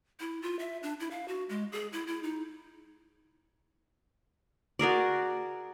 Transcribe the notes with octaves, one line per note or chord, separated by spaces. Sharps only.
E4
F4
E5
D4
E4
F5
F#4
G#3
G#4
E4
E4
D#4
F#4 G#4 A#4 D5